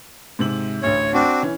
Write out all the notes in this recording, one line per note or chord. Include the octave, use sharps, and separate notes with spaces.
G#2 C3 F#7
A1 D2 C#5
C4 D4 F#4
E3 C#4